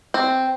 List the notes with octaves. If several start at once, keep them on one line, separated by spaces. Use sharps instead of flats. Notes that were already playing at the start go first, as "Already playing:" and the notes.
C4